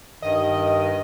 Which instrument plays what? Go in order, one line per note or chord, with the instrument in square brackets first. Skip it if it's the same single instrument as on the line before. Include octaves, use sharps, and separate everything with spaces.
[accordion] G2 D#3 [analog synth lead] D#5